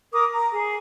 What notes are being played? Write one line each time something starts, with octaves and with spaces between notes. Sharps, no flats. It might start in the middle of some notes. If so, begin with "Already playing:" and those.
A#4 D6 D#6
A#5
G#4